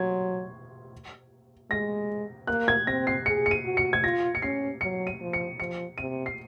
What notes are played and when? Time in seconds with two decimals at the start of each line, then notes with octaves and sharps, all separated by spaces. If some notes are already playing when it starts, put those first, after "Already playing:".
Already playing: F#3 C6 C#6 G#6
1.70 G#3 A#6
2.47 A#3 F#6
2.68 G#6
2.87 C4 A#6
3.07 C7
3.26 G#4 C#7
3.46 C#7
3.51 D#7
3.65 F#4
3.77 C#7
3.93 G#6
4.03 F4 A#6
4.35 C#7
4.42 C#4 C7
4.81 F#3 C#7
5.07 D#7
5.21 F3
5.33 C#7
5.59 F3 C#7
5.98 C3 D#7
6.26 C7